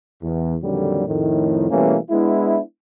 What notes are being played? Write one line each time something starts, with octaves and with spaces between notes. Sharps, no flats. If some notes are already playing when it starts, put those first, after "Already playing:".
E2
F2 A#2 D3 D#3 F#3 G3
F2 A2 D#3
B2 E3 G3 A3 A#3 C#4
G#3 B3 D4 E4